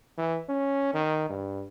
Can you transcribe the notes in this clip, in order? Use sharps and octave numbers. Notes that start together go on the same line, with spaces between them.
E3
C#4
D#3
G2